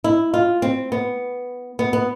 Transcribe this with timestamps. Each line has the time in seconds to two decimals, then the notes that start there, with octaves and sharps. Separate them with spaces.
0.04 E4
0.34 F4
0.62 C4
0.92 B3
1.79 B3
1.93 B3